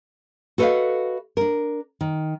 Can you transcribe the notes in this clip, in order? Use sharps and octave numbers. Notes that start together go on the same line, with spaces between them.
F#4 A4 B4 C#5 D#5 F5
D4 A#4
D#3